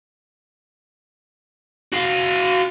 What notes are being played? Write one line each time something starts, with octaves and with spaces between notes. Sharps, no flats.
F#4 F5